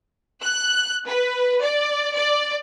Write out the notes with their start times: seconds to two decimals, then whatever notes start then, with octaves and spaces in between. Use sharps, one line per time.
0.44 F#6
1.07 B4
1.62 D5
2.15 D5